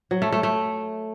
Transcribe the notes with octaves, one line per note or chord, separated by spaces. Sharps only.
F#3
A3
A3
A3